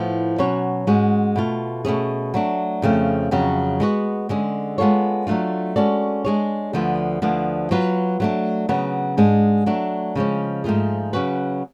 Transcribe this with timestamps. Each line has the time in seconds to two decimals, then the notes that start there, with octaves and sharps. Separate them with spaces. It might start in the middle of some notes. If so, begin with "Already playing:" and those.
Already playing: A2 F3 B3
0.38 B2 F#3 C#4 F#4 C#5
0.87 G#2 G#3 C#4 F#4
1.36 B2 A3 F4
1.85 B2 A3 C#4 G#4
2.34 F#3 A3 D4
2.82 F2 C#3 F3 A3
3.31 F2 C#3 F#3
3.80 G#3 B3 F#4
4.29 D3 G#3 C#4 G#4
4.78 G#3 B3 F4 A4 C#5
5.27 F#3 A3 D4 F4
5.76 G#3 C#4 F#4 A4 D5
6.25 G#3 D4 G#4 C#5
6.73 D2 D3 F3 B3
7.22 D2 D3 F3 B3 D4
7.71 F#3 B3 F4 B4
8.20 F#3 A3 D4
8.69 C#3 F#3 B3
9.17 G#2 G#3 D4
9.66 F#3 A3 D4
10.15 C#3 F3 G#3 C#4
10.64 G#2 F3 A3 F4 G#4
11.13 C#3 F#3 C#4 F#4 B4